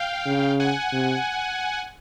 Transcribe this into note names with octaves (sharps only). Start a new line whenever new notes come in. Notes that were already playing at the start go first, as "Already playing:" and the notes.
Already playing: F5 G5
C#3
F#5 G#5
C3